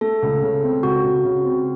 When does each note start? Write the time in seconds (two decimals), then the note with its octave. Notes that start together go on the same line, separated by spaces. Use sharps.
0.01 A3 A4
0.22 C#2
0.43 C#3
0.63 C4
0.83 C#2 F#4
1.04 C#2
1.25 C#3
1.45 C4